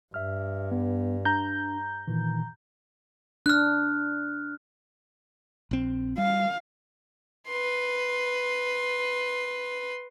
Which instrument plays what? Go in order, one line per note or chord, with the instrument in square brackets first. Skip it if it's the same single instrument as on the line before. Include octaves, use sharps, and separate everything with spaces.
[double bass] G2 [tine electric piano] E5 F6
[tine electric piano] B3
[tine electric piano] D4 [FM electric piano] A#5 G6
[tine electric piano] A#2 D#3 E3
[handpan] D4 [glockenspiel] F6 F#6
[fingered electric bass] A#1 C4
[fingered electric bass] G3 [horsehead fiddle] F5
[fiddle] B4 C6